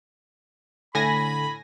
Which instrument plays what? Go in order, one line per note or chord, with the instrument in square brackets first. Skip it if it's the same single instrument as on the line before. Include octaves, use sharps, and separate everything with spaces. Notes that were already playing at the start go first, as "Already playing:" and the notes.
[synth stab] A2 G#5 A#6 [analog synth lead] D3 [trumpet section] B5